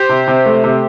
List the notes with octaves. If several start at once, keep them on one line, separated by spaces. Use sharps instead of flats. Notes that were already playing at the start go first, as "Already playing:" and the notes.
Already playing: G4 C5
C3
C3
A3
C3